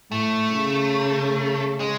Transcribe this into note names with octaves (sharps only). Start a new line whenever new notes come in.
A2 A3
C#3
G#3